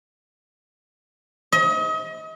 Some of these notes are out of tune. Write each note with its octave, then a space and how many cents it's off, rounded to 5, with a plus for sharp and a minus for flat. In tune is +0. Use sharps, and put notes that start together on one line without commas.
D#5 +35